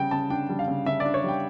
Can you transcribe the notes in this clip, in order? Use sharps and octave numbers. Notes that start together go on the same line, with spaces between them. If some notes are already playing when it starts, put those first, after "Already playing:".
Already playing: C#3 G3 G5
C#3 A5
D4 G5
G3
F5
C#3
C#3 E5
D5
D4
C#5
G3 G5